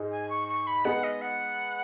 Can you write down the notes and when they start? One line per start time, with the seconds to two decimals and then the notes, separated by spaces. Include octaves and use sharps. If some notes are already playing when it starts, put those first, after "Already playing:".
Already playing: G#2 G#3 D#4 G#4
0.11 G#5
0.29 C#6
0.48 C#6
0.67 B5
0.85 G#3 B3 D#4 G#4 F#5
1.04 D#5
1.21 F#5